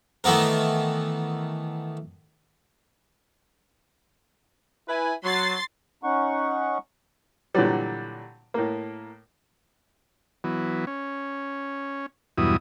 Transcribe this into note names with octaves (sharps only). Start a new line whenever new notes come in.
D#3 E3 A3 B3 A#4
E4 B4 G#5
F#3 C6 A6 C7
C#4 D#4 F#5 C#6
A#2 D3 E3 F#3 G3
A2 A#3
E3 F#3 B3
C#4
E2 G2 B2 F#3 E4 D#6